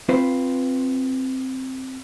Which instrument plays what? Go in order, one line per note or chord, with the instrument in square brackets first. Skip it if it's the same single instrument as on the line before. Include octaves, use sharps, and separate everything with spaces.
[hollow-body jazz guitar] C4 F4 B4 C5